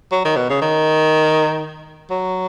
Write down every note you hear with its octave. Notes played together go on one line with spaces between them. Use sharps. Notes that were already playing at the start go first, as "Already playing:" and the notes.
F#3
D#3
B2
C#3
D#3
F#3